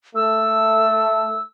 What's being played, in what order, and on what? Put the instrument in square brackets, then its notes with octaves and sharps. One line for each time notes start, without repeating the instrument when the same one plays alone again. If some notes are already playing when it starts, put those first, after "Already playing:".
[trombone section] A3 [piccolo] E6